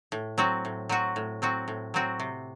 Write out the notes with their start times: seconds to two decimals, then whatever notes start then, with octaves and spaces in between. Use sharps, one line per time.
0.12 A2
0.38 F#3 C4 F#4
0.65 A2
0.89 F#3 C4 F#4
1.16 A2
1.42 F#3 C4 F#4
1.68 A2
1.94 F#3 C4 F#4
2.20 C3